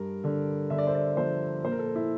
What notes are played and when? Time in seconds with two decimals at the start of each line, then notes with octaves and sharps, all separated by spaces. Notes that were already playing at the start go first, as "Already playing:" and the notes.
Already playing: G2 A#4
0.24 D3
0.70 D3 E5
0.78 D5
0.87 C5
0.95 D5
1.17 F3 C5
1.64 A#2 C5
1.72 A#4
1.79 A4
1.86 A#4
1.95 E4